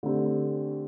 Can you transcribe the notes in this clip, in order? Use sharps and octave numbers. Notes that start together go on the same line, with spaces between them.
D3 A3 C4 G4